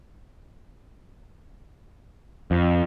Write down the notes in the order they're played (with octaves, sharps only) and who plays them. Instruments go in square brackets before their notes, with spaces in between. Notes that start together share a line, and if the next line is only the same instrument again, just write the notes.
[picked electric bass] F2